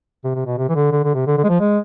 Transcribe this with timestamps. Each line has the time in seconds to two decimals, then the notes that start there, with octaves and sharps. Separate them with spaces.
0.24 C3
0.35 C3
0.46 B2
0.58 C3
0.69 E3
0.75 D3
0.92 D3
1.04 D3
1.15 C3
1.27 D3
1.38 D3
1.44 G#3
1.49 F3
1.60 G#3